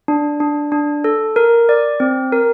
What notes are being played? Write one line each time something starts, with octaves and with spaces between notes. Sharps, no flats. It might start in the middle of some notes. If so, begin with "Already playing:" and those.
D4
D4
D4
A4
A#4
D5
C4
A#4